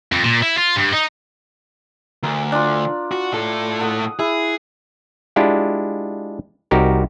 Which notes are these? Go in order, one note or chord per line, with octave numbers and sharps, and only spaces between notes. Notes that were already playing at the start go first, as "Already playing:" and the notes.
F2
A#2
E4
F4
G2
D#4
D2 A#4
D4 F4
F#4
A2 A4
F#5 D#6
E4 G#4
G#3 D4 E4 F4 G4
C2 D#4 F#4 G4 A#4